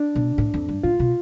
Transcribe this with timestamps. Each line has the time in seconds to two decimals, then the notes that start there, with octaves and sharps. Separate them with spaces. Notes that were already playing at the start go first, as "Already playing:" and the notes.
Already playing: D4
0.15 B2
0.38 A2
0.54 F2
0.68 G2
0.83 A2 F4
0.99 B2